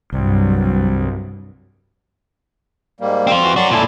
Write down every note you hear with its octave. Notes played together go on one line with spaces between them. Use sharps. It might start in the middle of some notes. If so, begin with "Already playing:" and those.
C2 G2 F#3
G#2 G3 A#3
C4 F4
E3 F#4
C#4 F#4 D5 C6 C#6
A#2 E4 A4 D5 G#5